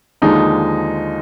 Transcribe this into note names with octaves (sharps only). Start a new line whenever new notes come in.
D#2 D3 F3 G#3 D#4